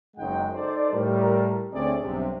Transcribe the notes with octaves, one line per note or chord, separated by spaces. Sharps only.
F#1 F#2 G#3 D#4 F#5 G5
D#4 A4 C5 D5
A2 G3 A#4
D2 A3 C4 C#4 G#4 D5
B1 G2 C3